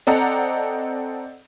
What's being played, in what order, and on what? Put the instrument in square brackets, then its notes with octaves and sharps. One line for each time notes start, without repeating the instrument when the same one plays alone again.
[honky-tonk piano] C4 A4 D5 D#5 F#5 A#5